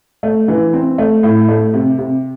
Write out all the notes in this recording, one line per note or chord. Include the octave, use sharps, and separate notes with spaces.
A3
E3
C4
A3
A2
A3
C3
C3